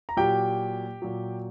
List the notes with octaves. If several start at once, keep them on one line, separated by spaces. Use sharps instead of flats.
A#5
A#2 F#3 G4 G5
A#2 F#3